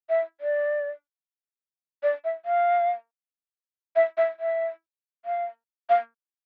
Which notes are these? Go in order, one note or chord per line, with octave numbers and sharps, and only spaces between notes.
E5
D5
D5
E5
F5
E5
E5
E5
F5
F5